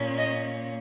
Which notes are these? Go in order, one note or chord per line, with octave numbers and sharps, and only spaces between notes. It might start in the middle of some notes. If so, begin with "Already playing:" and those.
Already playing: A#2 A#3 C#4
D#5